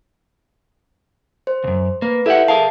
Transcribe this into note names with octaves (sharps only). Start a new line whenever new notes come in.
C5
C#2 F#2
A#3 B4
E4 G4 A4 E5 F#5
G#4 A#4 F5 A5